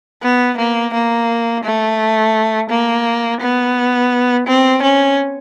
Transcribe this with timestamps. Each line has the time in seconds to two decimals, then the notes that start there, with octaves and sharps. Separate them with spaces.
0.22 B3
0.57 A#3
0.94 A#3
1.64 A3
2.70 A#3
3.41 B3
4.47 C4
4.83 C#4